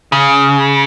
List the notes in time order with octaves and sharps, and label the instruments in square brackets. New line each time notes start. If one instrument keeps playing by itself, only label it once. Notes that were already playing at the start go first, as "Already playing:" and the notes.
[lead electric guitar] C#3